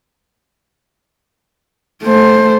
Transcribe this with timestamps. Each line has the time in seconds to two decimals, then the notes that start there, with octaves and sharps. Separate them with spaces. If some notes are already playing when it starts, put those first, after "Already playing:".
2.04 A3 C5